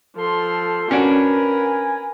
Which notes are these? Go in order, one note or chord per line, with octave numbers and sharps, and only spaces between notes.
F3 A4 C6
C#4 D4 F#4 A#4 B4 G#5